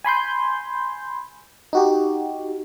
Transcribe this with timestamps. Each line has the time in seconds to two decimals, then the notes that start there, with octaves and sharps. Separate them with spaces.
0.05 G#5 B5 C6 G6
1.73 D#4 F#4 G4